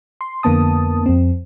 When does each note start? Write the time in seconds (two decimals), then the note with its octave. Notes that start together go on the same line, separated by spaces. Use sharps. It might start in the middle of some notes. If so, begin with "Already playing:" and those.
0.21 C6
0.43 F2 D3 A#3 B3 A5 D#6
1.06 F2 C4